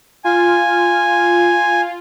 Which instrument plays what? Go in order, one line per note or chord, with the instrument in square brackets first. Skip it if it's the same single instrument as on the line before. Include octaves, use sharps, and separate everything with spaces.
[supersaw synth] F4 [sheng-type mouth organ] G#5